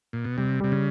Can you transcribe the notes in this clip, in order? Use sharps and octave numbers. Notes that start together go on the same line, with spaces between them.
A#2
B2
C3 G3
C3 G3
C#3